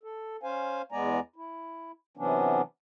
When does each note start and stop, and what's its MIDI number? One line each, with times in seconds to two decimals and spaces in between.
0.03 0.37 69
0.43 0.82 61
0.43 0.82 72
0.43 0.82 77
0.43 0.82 80
0.92 1.20 40
0.92 1.20 56
0.92 1.20 59
0.92 1.20 74
0.92 1.20 80
0.92 1.20 82
1.36 1.92 64
2.17 2.62 48
2.17 2.62 52
2.17 2.62 54
2.17 2.62 59
2.17 2.62 61
2.17 2.62 62